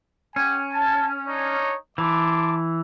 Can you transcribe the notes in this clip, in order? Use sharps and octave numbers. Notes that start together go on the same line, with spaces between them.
C#4 G4 F#5 G#5
A5
D4 D#4 C#5
E3 A5 C6 D6